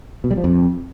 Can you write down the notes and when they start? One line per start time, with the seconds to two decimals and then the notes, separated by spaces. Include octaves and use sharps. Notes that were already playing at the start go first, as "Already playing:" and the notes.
0.24 B2
0.31 G3
0.37 F3
0.44 F2